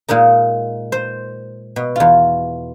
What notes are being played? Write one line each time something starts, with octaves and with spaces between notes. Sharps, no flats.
A#2 G#3 D#4 A#4
C5
B2
E2 F4